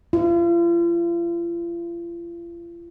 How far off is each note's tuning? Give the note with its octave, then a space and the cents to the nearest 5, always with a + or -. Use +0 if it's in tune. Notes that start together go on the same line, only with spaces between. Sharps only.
F4 -40